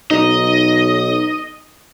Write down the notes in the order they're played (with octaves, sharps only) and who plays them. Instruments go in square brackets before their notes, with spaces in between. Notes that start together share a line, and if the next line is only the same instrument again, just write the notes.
[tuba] B1 [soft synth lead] D#4 [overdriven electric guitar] D#5